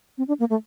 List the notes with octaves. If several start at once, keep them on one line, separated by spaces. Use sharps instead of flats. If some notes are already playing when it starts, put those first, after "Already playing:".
C4
D4
A#3
A3